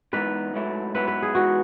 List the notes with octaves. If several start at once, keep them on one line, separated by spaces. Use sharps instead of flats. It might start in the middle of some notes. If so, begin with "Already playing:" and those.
G#2 E3 B3 D#4 B4
G#2 F#3 A3 E4
G#2 F#3 B3 E4 B4
B4
G#4
G#2 E3 G#3 B3 F#4